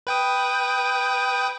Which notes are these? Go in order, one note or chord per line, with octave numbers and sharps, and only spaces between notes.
B4 G5 D#6